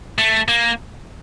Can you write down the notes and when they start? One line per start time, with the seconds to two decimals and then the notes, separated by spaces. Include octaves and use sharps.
0.19 A3
0.48 A#3